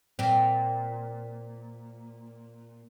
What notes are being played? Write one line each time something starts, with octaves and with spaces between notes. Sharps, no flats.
A#2 C4